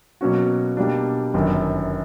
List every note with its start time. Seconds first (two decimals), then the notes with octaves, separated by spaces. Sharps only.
0.21 B2 F#3 A#3 C#4 F#4
0.77 B2 G3 A#3 D4
1.34 G1 F#2 D#3 F#3